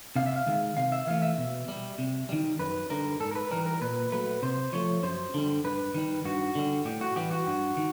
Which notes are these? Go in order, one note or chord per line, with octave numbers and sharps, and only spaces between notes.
C3 F5
E5
F5
D#3 G#3
C3 F5
E5
E3 A3 F5
E5
B2
G3
C3
D#3 G3
F#2 B4
D3 G3 A#4
G#2 A4
A#4
B4
E3 G3 A#4
A#4
A#2 B4
F#3 A3 B4
C3 C5
F3 A3 C#5
F#2 C5
D3 G3
G2 B4
D#3 G3
G2 F#4
D3 G3
A2 G4
F#4
E3 G3 G4
F#4
G2
D#3